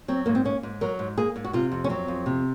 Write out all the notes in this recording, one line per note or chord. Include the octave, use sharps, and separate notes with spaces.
F#3 C4
G#2 A#3
C4
A#3 C#4
G#2
F#3 A#4
G#2
A#3 G#4
G#2
F#4
C3 F4
F2
C#4
F#3 C4
F2
C3